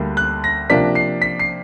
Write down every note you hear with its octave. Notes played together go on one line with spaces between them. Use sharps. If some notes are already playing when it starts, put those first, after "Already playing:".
Already playing: D2 D3 G3 A#3
F#6
A#6
C3 F3 A#3 D4 B6
C7
B6
C7